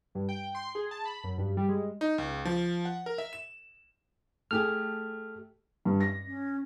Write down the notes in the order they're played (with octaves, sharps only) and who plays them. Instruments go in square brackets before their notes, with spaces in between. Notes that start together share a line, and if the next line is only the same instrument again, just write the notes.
[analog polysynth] G2
G5
C6
G#4
A5
B5
F#2
G2
G3
G#3
[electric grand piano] D#4
C#2
F3
F#5
A#4
E5
E7
[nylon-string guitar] A3 G4 G#4 [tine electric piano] F6
[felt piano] G2
A#6
[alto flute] C#4